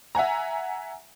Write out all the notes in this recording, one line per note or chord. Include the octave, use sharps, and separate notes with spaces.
E5 F#5 G#5 A#5